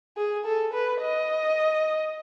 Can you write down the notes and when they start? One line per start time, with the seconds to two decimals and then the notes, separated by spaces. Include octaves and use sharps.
0.17 G#4
0.45 A4
0.73 B4
1.01 D#5